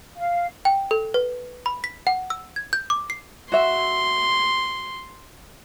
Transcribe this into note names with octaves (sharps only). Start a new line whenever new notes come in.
F5
G5
A4
B4
B5
B6
F#5
E6
G#6
G6
D6
C7
F#4 E5 C6